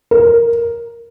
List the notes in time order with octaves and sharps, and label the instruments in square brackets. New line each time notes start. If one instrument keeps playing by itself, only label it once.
[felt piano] A#4